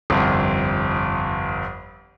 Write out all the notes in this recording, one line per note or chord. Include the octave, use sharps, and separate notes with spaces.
G1 C2 F2